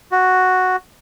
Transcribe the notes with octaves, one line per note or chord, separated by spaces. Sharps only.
F#4